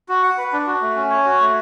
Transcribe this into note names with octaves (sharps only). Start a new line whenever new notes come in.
F#4
F#5
B4
D4
F#4
A3
C#4
C#5
F#4
A3